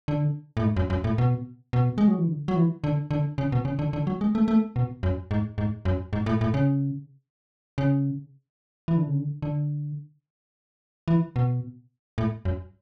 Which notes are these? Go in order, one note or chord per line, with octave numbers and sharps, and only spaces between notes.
D3
A2
G#2
F#2
F#2
A2
B2
B2
G#3
F#3
E3
D3
F#3
E3
D3
D3
C#3
B2
C#3
D3
D3
F#3
G#3
A3
A3
B2
F#2
G#2
G#2
F#2
G#2
A2
A2
C#3
C#3
E3
D3
C#3
D3
D3
E3
B2
A2
F#2